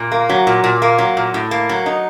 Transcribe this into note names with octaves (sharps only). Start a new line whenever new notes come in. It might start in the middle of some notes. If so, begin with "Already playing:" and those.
Already playing: A#2
A#3
F#3
A#2
A#2
A#3
F#3
A#2
A2
A#3
F#3
D#4